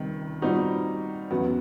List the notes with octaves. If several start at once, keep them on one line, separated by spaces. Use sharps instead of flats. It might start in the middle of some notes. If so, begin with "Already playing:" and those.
Already playing: C#2 C3 D#3 G3
A#2 G3 C4 D#4 F#4
E2 C#3 F#3 B3